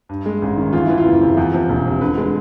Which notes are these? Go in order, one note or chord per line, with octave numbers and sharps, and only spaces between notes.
G2
G#3
A1
D#3
E2 F4
E3 E4
F4
F#1
C3
E2
F3
E1
C3
D3 B4
G#3